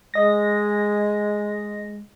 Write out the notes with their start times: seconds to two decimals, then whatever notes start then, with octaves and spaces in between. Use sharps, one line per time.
0.14 G#3 D#5 A#6